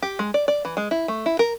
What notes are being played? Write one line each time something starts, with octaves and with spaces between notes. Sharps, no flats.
G4
G#3
D5
D5
E3
G#3
E4
A3
E4
A#4